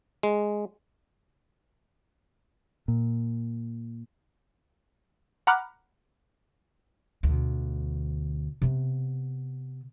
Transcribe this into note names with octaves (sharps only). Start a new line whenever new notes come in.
G#3
A#2
F#5 A#5 B5 D6 F6 F#6
D2 B2
C3 B3